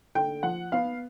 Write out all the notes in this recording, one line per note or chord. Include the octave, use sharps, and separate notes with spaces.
D3 G5
F3 F#5
B3 F5